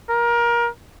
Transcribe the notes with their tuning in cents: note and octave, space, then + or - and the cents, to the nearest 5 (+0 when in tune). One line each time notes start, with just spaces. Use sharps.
A#4 +25